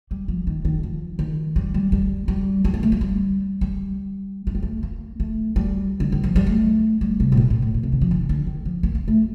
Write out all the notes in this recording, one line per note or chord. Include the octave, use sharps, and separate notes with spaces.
G3
F3
D#3
D#3
F3
D#3
G3
G3
G3
G3
G3
A#3
A3
A#3
G3
G3
A3
G3
A3
A#3
A3
G3
D3
D#3
F3
G3
A3
G3
C3
A2
A#2
A2
A2
A#2
C3
D#3
F3
D#3
D3
D#3
F3
A#3
A#3
A3